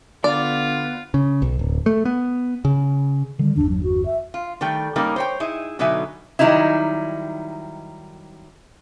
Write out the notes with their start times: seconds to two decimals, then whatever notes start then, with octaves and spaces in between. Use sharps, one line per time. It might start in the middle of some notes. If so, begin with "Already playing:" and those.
0.24 D3 B3 F4 D5
1.14 C#3
1.42 B1
1.59 D1
1.86 A3
2.05 B3
2.65 C#3
3.39 D3 D#3 G3
3.57 G1 E2 D4
3.69 F#3
3.83 F#4
4.06 E5
4.34 F4
4.61 D#3 G3 A3 G5
4.96 G3 A#3 C#4 D#4 G4 A#4
5.16 C5 C#5 G5
5.40 D#4 E4 G#4
5.79 B2 D3 F#3 D#4 E5 G#5
6.39 D#3 F#3 G3 D#4 E4